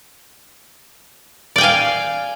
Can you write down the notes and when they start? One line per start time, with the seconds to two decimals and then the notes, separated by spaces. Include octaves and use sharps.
1.56 D5
1.58 G5
1.61 G#5
1.63 F5